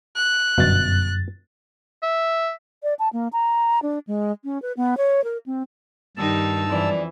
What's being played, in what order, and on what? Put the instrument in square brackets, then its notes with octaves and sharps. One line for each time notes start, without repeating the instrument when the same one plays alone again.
[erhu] F#6
[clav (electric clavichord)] G1 B2 F5 [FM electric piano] F#2 A6
[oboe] E5
[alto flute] D5
A5
A#3
A#5
D4
G#3
C#4
B4
B3
C#5
A#4
C4
[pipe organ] G2 A5 E6 [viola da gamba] D#3 G3 D#4
[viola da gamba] F2 E3 [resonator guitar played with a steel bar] G#3 D5